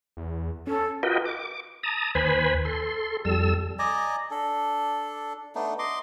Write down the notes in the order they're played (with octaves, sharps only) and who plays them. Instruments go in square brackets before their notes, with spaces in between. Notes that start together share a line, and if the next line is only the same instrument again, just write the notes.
[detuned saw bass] E2
[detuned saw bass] C#4 [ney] A4
[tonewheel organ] F4 F#4 A#4 B4 D#5 G5
D6
A5 A#5 D#6
D#2 B4 C5 G#5 B5
A4 C6
F2 G3 A4 E6
[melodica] D5 D#5 G#5 A#5
D4 A4
A3 B3 D4 D#4
D#5 C6 D6